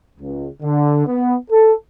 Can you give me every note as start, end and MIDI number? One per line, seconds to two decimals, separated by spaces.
0.21 0.47 37
0.63 1.05 50
1.06 1.35 59
1.51 1.73 69